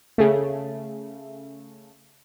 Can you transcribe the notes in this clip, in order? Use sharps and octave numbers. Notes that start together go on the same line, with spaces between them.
C#3 A3